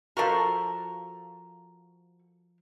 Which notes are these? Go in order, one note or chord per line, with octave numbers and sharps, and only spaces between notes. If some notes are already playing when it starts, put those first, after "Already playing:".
F3 F#4 A4 A#4 F5